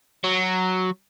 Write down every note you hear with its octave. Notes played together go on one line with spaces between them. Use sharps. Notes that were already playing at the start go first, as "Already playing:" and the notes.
F#3